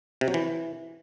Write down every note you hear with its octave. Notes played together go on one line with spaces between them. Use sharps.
C3
F#3
E3